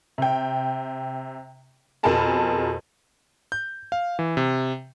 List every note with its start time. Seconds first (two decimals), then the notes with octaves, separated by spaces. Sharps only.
0.18 C3 G5
2.03 F2 B2 G#4 A#4 A5 B5
3.52 G6
3.92 F5
4.19 E3
4.37 C3